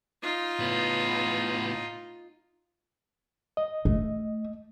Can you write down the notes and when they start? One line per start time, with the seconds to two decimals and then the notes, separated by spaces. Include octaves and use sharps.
0.22 D#4 F4
0.59 A2 B3
3.57 D#5
3.85 A3